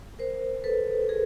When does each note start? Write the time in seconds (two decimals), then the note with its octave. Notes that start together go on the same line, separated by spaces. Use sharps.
0.19 A#4 C5
0.64 A4 B4
1.01 A4
1.09 G#4 A#4